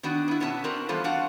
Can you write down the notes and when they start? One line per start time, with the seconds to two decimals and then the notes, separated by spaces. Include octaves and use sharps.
0.03 D#3 B3 D4 F#4
0.28 B3 E4
0.40 B2 B3 C#4 F4 E5 A5
0.64 C4 D4 F#4 A#4
0.89 E3 G3 B3 F4 A4 C5
1.04 D4 F#4 F5 F#5